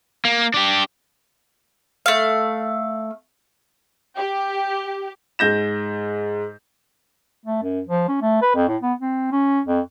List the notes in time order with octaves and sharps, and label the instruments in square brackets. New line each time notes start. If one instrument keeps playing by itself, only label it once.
[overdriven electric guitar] A#3
D4 G4
[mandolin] A3 F5
[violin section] G4
[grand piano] G#2 G6 A#6 E7
[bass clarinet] A3
F#2
F3
C#4
A3
B4
F2
A2
B3
C4
C#4
F2